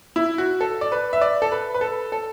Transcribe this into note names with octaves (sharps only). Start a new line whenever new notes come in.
E4
F#4
A4
D5
B4
E5
D5
A4
B4
B4
A4
A4